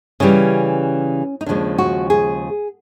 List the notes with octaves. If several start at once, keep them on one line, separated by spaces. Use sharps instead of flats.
C#3 E3 G3 C#4
D#4
D#2 C#3 F3 G#3 D4
F#4
G#4